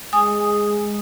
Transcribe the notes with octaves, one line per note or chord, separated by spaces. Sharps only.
G#3 G#5 D#6